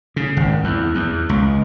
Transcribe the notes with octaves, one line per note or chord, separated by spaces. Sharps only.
C#3
G#1
E2
E2
C#2